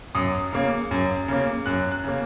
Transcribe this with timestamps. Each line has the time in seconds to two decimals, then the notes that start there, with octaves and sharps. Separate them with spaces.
0.15 F#2 D#6
0.53 C#3 A#3
0.91 F#2
1.28 C#3 A#3
1.66 F#2 F#6
1.92 F#6
2.04 C#3 A#3